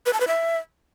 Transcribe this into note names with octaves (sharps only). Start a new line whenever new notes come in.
B4
A5
B4
E5